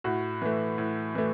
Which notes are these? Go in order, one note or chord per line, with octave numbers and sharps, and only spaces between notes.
A2 F#4
E3 A3
A2
E3 A3